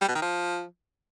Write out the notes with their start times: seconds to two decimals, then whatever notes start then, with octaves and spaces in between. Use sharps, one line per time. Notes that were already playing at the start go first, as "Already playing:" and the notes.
0.01 G3
0.08 B2
0.15 D#3
0.22 F3